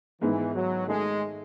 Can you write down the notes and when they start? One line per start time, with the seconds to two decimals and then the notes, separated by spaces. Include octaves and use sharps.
0.21 G#2 D#3 E3 G#3 B3
0.54 F#3
0.87 D#3 G#3 A3 D#4 G#4 D#5